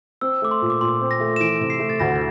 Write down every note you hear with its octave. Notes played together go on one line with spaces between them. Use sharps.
C4 E6
A3 D6
C6
A#2
D6
A#2 C6
C4
A#6
A3
E7
E3 D7
C3
C7
A3
A6
D2 A#6